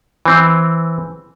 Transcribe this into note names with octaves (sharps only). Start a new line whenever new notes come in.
E3 C4